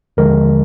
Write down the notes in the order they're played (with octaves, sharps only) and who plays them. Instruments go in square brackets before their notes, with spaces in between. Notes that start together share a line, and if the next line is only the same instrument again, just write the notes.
[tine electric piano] D#2 D3 F3 G#3 A#4